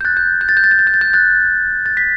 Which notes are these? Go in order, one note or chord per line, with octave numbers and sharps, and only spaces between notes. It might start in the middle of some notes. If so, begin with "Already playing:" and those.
G6
F#6 A6
G6
G6
A6
G6
A6
G6
A6
G6
A6
G6
F#6 A6
A6
B6